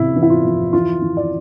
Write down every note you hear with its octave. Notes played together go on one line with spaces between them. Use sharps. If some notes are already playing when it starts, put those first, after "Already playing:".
Already playing: C3 E3 E4
E3
E4
F4
F2
E3 F4
E3
D5